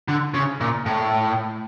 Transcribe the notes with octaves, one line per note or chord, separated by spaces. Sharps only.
D3
C#3
A#2
A2